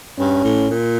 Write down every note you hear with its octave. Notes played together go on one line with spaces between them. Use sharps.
G2 C#4
A2
A#2